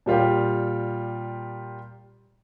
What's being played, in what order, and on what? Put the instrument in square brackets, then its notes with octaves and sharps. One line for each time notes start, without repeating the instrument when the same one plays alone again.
[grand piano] A#2 G3 F4 G4